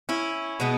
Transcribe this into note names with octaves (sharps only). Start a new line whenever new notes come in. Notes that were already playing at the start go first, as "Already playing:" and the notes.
C#4 E4
B2 G#3 B3